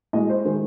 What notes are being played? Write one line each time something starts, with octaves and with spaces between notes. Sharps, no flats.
A2 G#3 D#5
C5
D#3 G#3